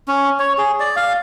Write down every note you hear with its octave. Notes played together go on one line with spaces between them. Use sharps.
C#4
C#5
G#4
D5
F5